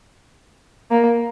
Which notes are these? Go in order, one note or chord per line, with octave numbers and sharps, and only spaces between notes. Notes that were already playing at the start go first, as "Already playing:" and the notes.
A#3